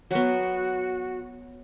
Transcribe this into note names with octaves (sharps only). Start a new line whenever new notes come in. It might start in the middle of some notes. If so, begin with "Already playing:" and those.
F#3 B3 F#4